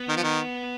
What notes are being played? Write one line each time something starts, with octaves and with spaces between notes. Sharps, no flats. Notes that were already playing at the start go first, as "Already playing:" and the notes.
Already playing: B3
D#3
F3
D#3